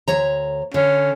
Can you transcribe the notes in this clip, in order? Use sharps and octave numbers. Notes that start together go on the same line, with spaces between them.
D2 C#5 A#5
D3 C#4